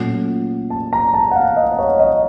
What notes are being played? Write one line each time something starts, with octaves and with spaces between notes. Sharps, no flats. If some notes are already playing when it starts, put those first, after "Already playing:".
Already playing: A#2 F#3 A3 C#4 F4 F#5
A5
A#5
A5
F#5
F5
D#5
D#5
C#5
D#5